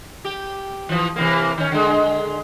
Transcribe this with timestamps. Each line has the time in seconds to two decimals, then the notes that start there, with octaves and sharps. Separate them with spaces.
0.25 G4
0.89 E3 F3
1.16 C3 E3 A#3
1.58 D#3 C#4
1.71 D3 G#3